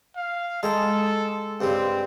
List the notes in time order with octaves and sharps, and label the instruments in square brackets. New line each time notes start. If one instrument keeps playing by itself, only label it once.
[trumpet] F5
[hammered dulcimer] G#3 [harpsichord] G#4 G5 A#5 [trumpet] A4
[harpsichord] G2 C#3 G3 [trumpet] C4